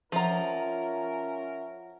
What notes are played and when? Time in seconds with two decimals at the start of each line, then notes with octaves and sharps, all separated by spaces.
0.12 F3 C#4 F4 A#4 E5 F#5 A#5